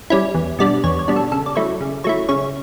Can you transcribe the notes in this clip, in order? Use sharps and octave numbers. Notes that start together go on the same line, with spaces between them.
G3 C#4 E4
E2
B2 G3 D4 D5
E2 C#5
C#5
B2 G3 D4
A4
C#3 A4
D5
F#3 A3 E4 C#5
C#3
F#3 A3 E4 C#5
C#3 C#5